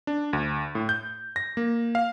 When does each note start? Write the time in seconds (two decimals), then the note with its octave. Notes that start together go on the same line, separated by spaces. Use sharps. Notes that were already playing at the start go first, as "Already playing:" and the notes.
0.07 D4
0.33 D2
0.75 A2
0.89 G6
1.36 A#6
1.57 A#3
1.95 F5